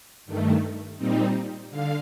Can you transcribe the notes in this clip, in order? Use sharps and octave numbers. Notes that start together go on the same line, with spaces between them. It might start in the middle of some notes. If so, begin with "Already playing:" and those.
G2 D#3 A3
A#2 G3 C4 D#4
D3 F5